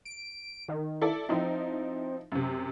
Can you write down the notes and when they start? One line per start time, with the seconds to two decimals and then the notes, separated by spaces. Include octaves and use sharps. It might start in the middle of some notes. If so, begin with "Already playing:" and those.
0.05 D7
0.68 D#3
1.01 E4 A4 D5
1.29 F3 C4 D#4 E4
2.32 F#2 C3